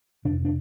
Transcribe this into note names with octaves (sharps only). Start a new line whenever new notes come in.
F2 C3 D4
D4